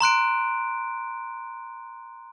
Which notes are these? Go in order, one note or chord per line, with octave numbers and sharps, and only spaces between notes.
A#5 C6 F#6 D7